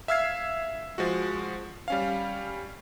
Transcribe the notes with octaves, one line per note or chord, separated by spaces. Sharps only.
E5 F5 E6 F6 G#6 C7
F3 G#3 F#4
G3 C#4 F5